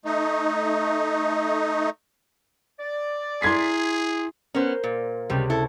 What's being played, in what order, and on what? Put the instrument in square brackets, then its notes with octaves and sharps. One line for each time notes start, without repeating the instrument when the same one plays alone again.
[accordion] A3 D#4
[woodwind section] D5
[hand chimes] E4 C7 [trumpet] G#4 [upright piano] C6 G#6 B6
[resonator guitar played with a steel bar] B3 C#4 [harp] A#4 C5
[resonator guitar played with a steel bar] A#2
[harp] C#2 C3 [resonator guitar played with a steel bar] G3
[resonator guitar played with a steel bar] E4 A4